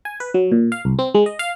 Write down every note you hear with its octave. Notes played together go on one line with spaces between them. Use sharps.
G#5
B4
F#3
A#2
F5
C2
C4
G#3
D#5
F5